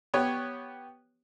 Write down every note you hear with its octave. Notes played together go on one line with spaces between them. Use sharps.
B3 G4 C#5